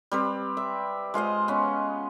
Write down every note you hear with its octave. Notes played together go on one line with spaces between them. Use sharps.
G3 C4 B4
E5
G#3 F4 C5 D#5
B3 C#4